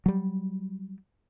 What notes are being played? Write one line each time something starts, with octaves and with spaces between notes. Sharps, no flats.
F#3 G3